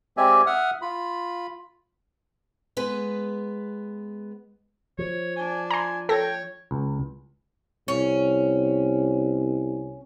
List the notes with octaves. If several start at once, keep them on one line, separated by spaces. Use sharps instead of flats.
G#3 C4 G4 D5 E5 G#5
E5 F#5 D#6 F6
F4 B5
G#3 B3 B4
F3 C#5
D4 G#5
G#5 A#5 C6
A4 C#5 G5 A#6
C#2
C2 C#4